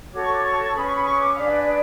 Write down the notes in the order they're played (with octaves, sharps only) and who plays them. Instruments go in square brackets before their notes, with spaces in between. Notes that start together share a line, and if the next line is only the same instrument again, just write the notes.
[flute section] F#4 A4 C#5 D6
C#6
D6
C#6
C#4 G#4 B4 B5
C#6
B5
C#6
D6
D4 G#4 B4 F5
D5
D5